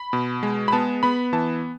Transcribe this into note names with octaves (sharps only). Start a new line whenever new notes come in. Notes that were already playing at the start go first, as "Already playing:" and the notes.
Already playing: B5
B2
G#3
B5
B3 A5
B3 B5
E3 A5